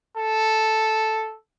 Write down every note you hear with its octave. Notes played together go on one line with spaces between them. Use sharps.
A4